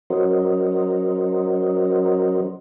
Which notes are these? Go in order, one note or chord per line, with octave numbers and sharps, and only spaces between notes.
F#3 C#4 F#4 A#4 C5 D#5